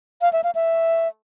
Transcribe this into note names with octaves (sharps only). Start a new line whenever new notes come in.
F5
E5
F5
E5